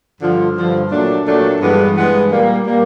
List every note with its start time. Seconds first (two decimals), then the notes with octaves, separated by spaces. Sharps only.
0.21 G2 D3 F3
0.56 G2 D3 F3
0.91 A#2 F#3 A3 D4
1.25 A#2 F#3 A3 D4
1.60 G2 E3 G#3 B3
1.95 G2 E3 G#3 B3
2.30 A#2 G3 A#3
2.65 A#2 G3 A#3